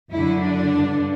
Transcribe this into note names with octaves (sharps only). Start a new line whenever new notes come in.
F#2 D3 E4
D4
G2 D3